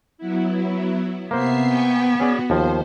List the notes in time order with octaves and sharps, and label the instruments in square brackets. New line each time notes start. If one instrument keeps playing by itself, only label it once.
[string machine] F#3 B3 E4
[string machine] C3 E5 C7 [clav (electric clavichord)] A#3 C5 [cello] B3
[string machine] G5 G#5 C#6
[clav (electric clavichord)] C#4 G#4 D5 [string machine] F#4
[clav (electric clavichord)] D#2 F3 [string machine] C5